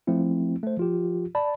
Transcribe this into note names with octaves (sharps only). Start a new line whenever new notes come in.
F3 A3 C4 E4
A3 C5
F3 F4 G4
D5 A5 B5